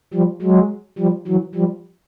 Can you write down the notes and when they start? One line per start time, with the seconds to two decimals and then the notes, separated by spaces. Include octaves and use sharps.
0.14 F3 G3
0.42 F#3 G#3
0.98 F3 G3
1.27 E3 F#3
1.55 F3 G3